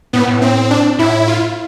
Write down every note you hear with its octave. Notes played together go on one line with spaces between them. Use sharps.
A2 B3
A2
C4
D4
A2 E4
F4